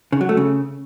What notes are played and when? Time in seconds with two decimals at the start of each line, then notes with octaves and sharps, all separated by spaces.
0.12 C#3
0.21 F#3
0.29 A3
0.37 C#3